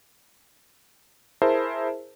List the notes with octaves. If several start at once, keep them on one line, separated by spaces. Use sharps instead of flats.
E4 G#4 A#4 C5 E5 A5